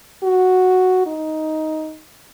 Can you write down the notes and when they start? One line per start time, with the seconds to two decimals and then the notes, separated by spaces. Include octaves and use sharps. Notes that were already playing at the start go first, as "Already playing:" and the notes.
0.23 F#4
1.06 D#4